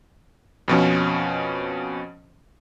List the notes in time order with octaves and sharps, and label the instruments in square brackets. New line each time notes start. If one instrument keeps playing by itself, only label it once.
[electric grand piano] F2 B2 F3 C#4